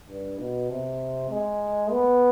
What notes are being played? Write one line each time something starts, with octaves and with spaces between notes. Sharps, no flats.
G2
B2
C3
G#3
B3